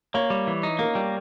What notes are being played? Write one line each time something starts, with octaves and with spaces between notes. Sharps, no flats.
A#3 C#5
G3
E3
D#4
A#3 A#4
G3